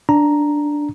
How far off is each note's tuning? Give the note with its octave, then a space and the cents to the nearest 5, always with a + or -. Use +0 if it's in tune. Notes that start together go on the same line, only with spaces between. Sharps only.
D4 +0 A#5 +0